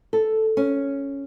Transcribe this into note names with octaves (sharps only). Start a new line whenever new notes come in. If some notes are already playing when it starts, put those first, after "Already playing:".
A4
C#4